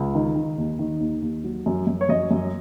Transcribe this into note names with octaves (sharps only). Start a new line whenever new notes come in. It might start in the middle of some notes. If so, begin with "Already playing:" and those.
Already playing: C#2
D#3
D#3
D#2
D#3
D#2
D#2
F#3
F#2
F#2
C#5
F#2 D#5
F#2